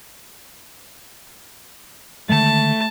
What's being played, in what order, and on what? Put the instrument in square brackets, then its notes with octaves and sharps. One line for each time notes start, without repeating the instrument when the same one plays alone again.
[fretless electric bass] D3 D#3 G#3 [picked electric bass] A3 [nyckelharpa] A5